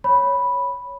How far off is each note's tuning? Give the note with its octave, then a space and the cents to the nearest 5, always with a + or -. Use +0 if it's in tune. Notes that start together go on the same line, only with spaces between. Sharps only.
C#5 +0 B5 -5